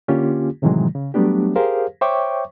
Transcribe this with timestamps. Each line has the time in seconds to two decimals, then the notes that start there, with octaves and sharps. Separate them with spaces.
0.08 D3 A#3 C#4 F4 G4
0.62 A2 C3 D#3 E3 F#3 G#3
0.95 C#3
1.14 F#3 G3 A3 B3 D4 G4
1.56 G4 G#4 A#4 C5 F5
2.01 C5 C#5 E5 G5 C#6 D6